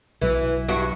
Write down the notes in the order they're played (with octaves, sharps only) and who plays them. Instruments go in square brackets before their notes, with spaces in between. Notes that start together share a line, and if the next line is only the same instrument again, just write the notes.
[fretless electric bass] B1 F#3 [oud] E3
[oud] G2 F#4